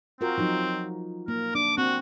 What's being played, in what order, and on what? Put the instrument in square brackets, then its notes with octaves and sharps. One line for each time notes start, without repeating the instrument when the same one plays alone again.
[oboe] C4 [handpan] F4 F#4 A#4
[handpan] F3 F#3 D#4
[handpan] A#3 [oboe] A#4
[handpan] D4 [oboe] D6
[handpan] C4 [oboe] F#4